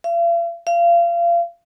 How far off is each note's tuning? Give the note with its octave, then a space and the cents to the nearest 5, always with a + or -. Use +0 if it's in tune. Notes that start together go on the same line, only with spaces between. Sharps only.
F5 -45
F5 -30